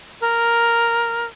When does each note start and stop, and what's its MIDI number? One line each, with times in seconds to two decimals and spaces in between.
0.21 1.26 70